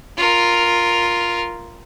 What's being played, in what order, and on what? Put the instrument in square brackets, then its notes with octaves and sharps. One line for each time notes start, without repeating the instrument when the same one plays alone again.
[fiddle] F4 A#4